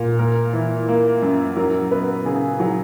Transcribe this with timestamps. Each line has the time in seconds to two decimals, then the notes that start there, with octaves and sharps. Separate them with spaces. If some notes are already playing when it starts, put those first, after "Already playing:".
Already playing: A#2
0.19 A#3 A#4
0.53 E3
0.88 A#3
1.22 F#2
1.57 F#3 A#4
1.91 B3 B4
2.25 C#3 G#4
2.60 F#3